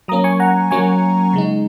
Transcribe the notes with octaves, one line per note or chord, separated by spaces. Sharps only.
F#3 A#3 C#4 A#5 D#6
G#5 C#6
F#5 A#5
F#3 A#3 C#4 G#5 C#6
C#3 G#3 D#4